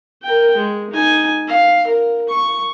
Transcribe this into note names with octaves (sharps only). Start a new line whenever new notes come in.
A#4 G5
G#3
D#4 G#5
F5
A#4
C#6